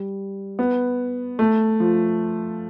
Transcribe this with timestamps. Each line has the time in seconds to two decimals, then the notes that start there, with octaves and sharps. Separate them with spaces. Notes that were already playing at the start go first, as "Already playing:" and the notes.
Already playing: G3
0.59 B3
1.39 A3
1.80 F3